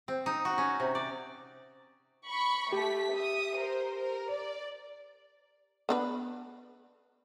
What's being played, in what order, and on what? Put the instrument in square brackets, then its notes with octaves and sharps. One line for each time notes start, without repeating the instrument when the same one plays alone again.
[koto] C4
D#4
F#4
C#4
C3
D5
[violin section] B5 C#6
[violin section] A3 B6 [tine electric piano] G4
[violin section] E5 D#6
A#4 C5
A#4
D5
[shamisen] B3 D4 B4